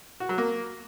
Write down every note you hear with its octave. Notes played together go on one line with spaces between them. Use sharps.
F#4
F#3
A#3